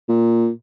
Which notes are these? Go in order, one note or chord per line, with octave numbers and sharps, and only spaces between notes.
A#2